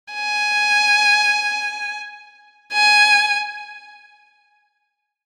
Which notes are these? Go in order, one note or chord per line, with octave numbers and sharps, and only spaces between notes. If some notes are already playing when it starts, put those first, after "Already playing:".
G#5
G#5